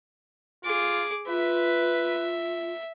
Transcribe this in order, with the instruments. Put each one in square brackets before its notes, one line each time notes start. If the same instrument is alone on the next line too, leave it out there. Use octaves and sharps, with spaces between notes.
[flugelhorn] F4 [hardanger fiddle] G#4 D6
[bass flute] F4 [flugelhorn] B4 [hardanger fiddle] E5